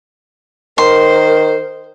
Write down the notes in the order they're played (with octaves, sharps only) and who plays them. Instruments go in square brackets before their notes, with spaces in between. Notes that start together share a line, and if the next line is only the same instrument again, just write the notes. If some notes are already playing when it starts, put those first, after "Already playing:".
[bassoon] D#3 [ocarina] A#4 [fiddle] C5 [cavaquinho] C6